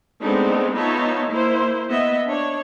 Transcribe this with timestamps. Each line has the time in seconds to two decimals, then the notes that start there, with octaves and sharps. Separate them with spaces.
0.22 G#3 A3 B3 C4 D4 D#4
0.74 B3 D#4 F4 C#5 E5 A5
1.30 A#3 E4 C5
1.90 B3 D#5 E5
2.26 D4 C#5